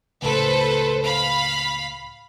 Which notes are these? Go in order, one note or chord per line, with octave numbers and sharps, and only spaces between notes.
C#2 A2 A4 B4 C5
F5 B5